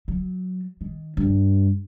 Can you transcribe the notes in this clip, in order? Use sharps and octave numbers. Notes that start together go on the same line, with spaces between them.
F#3
D#3
G2